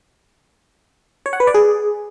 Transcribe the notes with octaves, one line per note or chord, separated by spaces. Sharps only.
C#5
F#5
B4
D5
G#4